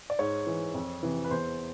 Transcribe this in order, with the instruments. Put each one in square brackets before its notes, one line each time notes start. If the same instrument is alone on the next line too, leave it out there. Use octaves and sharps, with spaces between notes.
[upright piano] D5
G#2 C#5
E3
F2
C3 E3
B4
E2 C5